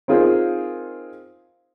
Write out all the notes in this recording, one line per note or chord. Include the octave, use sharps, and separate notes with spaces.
C4 D#4 F4 G#4 A#4 C5